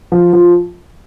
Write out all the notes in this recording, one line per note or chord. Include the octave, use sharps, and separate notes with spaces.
F3
F3